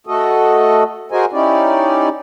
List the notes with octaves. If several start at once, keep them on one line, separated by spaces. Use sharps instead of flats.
A3 F#4 A4 D#5
F#4 G#4 A#4 C5 D#5 G#5
C#4 D#4 E4 G4 D5